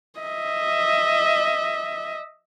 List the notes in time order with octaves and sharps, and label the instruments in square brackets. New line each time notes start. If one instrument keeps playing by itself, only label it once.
[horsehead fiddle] D#5 E5